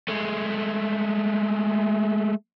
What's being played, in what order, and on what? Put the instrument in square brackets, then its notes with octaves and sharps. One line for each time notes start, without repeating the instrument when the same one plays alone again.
[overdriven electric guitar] G#3 A3